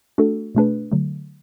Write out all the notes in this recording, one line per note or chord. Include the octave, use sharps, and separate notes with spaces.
A3 D4 F#4 A4
B2 A3 D4 G#4 B4
D3 F#3 A3